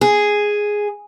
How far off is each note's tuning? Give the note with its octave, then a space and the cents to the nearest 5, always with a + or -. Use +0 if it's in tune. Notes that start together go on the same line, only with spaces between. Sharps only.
G#4 +0